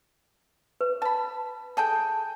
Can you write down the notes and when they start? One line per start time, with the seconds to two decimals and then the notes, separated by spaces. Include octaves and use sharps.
0.81 B4
1.02 A5 B5
1.77 G#4 A4 G5 A5